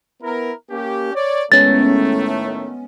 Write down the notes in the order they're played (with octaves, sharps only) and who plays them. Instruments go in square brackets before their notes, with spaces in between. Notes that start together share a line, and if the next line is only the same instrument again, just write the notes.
[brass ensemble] B3 E4 A#4
A#3 C#4 G4
C#5 D5
[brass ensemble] A2 D#3 A3 [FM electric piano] G#3 B3 C#4 [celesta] A6